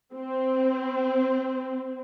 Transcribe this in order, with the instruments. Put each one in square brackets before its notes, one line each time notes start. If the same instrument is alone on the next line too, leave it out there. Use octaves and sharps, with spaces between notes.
[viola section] C4